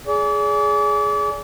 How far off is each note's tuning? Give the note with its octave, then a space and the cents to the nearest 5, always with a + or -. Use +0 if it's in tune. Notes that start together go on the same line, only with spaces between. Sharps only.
G#4 +10 D5 -35